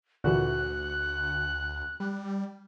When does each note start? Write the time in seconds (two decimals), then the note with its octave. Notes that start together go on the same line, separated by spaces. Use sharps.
0.24 D2 A#2 D3 E3 F#4 F#6
2.00 G3